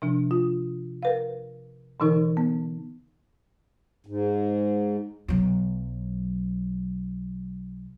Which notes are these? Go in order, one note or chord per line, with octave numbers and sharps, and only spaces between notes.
C3 F3 D4
F4
A#4 B4 F5
B2 D3 E3 D#4 A#4
B3
G#2
B1 F#3